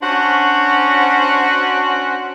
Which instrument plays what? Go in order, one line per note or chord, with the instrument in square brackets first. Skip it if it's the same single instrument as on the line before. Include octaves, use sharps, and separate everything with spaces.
[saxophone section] C#4 D4 F#4 C5 C#5 F#5